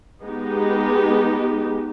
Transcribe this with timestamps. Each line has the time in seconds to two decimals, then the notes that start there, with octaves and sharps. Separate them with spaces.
0.23 G#3 B3 D#4 G4